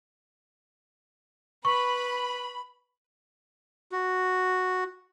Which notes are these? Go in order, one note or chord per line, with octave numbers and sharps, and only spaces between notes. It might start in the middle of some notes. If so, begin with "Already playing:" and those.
B4 B5 C#6
F#4